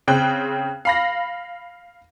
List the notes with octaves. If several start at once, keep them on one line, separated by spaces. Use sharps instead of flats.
C#3 C4 G5 F#6
F5 B5 A#6